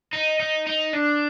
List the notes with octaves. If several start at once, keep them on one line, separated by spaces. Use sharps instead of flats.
D#4
D#4
D#4
D4